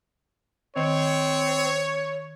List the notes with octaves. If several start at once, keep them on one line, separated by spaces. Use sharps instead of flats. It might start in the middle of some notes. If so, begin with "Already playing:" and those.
D#3 C4 C#5